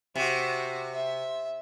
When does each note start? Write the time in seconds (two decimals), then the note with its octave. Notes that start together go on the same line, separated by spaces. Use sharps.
0.16 C3 F#4
0.92 E5